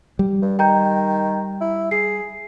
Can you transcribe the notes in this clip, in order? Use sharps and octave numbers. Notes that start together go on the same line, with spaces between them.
G3
G2
D#3 G5 A#5 G6
E4
G#4 C7